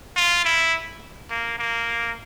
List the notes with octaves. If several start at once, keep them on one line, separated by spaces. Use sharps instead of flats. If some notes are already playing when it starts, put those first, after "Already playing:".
F4
E4
A#3
A#3